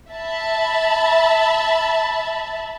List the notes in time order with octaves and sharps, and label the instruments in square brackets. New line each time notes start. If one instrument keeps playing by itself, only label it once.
[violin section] E5 A5 B5